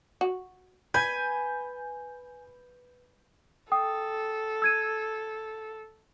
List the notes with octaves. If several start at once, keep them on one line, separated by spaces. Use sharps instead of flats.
F#4
B4 G#5 B5 G6
A4 G5 D#6
E6 G#6 D#7